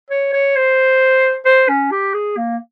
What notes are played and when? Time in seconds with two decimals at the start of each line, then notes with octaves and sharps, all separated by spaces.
0.10 C#5
0.33 C#5
0.56 C5
1.46 C5
1.69 C#4
1.92 G4
2.14 G#4
2.37 A#3